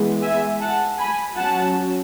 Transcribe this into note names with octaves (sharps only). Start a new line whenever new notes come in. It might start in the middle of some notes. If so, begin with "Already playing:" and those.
Already playing: E3 G#3 B3
E5 G#5
F#5 A5
G#5 B5
F#3 C#4 F#5 A5